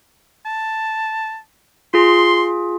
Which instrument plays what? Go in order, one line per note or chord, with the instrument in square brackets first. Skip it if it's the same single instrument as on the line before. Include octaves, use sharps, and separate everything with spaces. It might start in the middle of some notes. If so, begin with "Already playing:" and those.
[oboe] A5
[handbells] F4 G#4 [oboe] C6